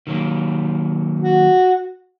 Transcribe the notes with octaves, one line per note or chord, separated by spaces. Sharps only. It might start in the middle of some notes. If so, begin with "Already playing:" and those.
D#3 F#3 A#3
F#4